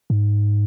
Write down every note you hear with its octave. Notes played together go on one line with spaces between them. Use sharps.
G#2